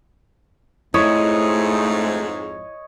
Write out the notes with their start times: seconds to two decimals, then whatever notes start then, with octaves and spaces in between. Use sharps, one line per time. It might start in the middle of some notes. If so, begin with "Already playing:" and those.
0.94 F2 G#2 A3 E4 C#5 D#5